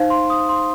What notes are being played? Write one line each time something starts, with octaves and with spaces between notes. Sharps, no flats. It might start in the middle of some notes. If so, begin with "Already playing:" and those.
Already playing: D#4 C5 F5
C6
D#6
C6